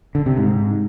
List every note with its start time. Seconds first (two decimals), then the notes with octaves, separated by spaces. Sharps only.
0.15 D3
0.26 C3
0.38 G#2